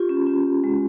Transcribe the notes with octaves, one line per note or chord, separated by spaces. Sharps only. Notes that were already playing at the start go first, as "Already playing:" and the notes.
Already playing: F4 G4
C#4
C#4
G#3